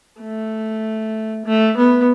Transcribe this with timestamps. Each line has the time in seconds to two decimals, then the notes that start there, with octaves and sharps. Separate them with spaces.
0.21 A3
1.45 A3
1.77 B3